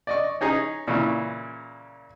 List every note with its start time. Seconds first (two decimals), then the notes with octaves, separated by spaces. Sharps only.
0.07 D5 D#5 C#6
0.41 C#4 D#4 G#4 A#5
0.88 A#2 C#3 E3